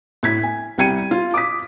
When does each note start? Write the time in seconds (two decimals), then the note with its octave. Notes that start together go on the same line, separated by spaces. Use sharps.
0.23 A2 G#6 B6
0.43 G#5
0.78 C2 G3 G5 G#6 C#7 D#7
1.11 F4
1.34 D6 D#6 B6